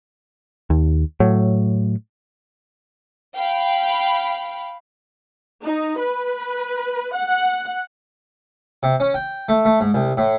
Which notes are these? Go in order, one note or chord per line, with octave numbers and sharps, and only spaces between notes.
D#2
A2 F#3
F5 G5 B5
D#4
B4
F#5
C3
C#4
G5
A3
A3
G#2
C2
A2